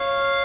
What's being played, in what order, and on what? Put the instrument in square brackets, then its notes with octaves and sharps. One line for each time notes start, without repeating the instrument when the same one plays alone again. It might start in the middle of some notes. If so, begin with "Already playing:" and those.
Already playing: [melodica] C#5 F5